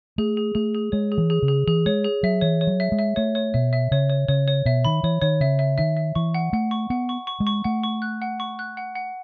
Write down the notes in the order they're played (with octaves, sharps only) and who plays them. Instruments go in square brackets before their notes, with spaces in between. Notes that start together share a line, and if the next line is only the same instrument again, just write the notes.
[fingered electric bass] A3 [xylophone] G#4
[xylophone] G#4
[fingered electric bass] A3 [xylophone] G#4
[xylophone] G#4
[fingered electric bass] G#3 [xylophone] C#5
[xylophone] G#4
[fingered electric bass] E3
[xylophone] G#4
[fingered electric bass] C#3
[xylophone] G#4
[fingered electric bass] E3 [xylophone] G#4
[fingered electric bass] G#3 [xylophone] C#5
[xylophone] G#4
[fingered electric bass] F#3 [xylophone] E5
[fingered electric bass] E3 [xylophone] C#5
[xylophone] C#5
[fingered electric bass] F#3
[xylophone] E5
[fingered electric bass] G#3
[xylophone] E5
[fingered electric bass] A3 [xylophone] C#5
[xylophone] C#5
[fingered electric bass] B2 [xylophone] E5
[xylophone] E5
[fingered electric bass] C#3 [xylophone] C#5
[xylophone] C#5
[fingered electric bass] C#3 [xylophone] C#5
[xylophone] C#5
[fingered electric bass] B2 [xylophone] E5
[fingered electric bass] D#3 [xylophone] B5
[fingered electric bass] E3 [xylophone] C#5
[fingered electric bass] D#3 [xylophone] C#5
[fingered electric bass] C#3 [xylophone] E5
[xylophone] E5
[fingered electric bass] D#3 [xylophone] E5
[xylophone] E5
[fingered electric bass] E3 [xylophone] C#6
[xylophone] F#5
[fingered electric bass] A3 [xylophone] F#5
[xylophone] C#6
[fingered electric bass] B3 [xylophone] F#5
[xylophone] C#6
C#6
[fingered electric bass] G#3
[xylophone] C#6
[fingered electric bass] A3 [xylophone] F#5
[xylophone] C#6
F#6
F#5
C#6
F#6
F#5
F#5